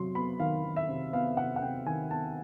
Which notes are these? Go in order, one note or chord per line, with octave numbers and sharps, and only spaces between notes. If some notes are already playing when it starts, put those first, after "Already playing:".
Already playing: C3 F#3 C6
B3 B5
D#3 F5
D#3
E5
C3
B3 F5
C3 F#5
F#5
C3 G5
D#3 G#5
B3 A5